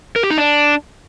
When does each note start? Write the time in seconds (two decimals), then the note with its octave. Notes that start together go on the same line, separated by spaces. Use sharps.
0.16 A#4
0.23 G4
0.30 D#4
0.38 D4